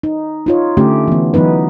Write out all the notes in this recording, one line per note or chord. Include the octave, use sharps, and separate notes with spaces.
D#4
D#4 F4 C#5
D3 A3 C#4 G4
E3 B3
E3 F#3 B3 D#4 B4